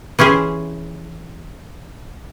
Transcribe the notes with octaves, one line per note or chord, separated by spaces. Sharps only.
E3 C#4 G4 G#4 C5